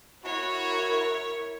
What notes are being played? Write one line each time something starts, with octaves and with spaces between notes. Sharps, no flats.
E4 F#4 A#4 C#5